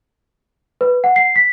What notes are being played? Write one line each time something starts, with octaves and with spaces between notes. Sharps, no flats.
B4
F#5
C7
B6